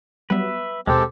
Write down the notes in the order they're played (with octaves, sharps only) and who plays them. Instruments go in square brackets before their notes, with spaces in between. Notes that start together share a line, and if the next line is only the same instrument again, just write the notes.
[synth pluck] F#3 G3 B3 [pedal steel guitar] B4 E5
[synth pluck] D#2 B2 [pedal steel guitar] G#3 A#4 C5 [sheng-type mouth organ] C4 G4 A4